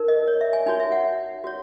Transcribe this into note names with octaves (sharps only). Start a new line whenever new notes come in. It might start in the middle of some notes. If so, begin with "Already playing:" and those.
Already playing: D#4 A#4
D#5
C#5
E5
G#5
D#4 F#4 C#5 G#5
E5
F#5
F#4 C#5